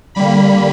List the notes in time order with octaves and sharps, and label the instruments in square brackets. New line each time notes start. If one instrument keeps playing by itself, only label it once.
[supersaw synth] D3 G3 A#3 B5